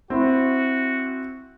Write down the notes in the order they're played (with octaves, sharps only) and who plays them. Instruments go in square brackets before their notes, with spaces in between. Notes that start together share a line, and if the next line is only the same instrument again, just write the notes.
[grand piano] C4 E4 [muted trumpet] F#4